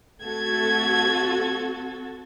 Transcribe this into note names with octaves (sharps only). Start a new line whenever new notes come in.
A3 C4 F#4 A4 G#6